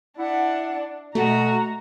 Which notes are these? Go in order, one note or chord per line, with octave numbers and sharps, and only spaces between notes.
D4 E4 F#5
B2 A3 F#4 A#5